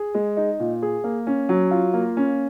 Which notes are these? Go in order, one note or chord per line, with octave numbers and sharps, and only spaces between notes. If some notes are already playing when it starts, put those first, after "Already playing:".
Already playing: G#4
G#3
D#4
A#2
G#4
A#3
C#4
F#3
F4
A#3
C#4